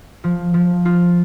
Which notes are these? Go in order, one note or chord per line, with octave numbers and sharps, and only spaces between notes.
F3
F3
F4